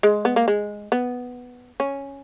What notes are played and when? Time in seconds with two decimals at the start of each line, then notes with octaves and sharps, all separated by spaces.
0.03 G#3
0.25 B3
0.36 A#3
0.48 G#3
0.92 B3
1.80 C#4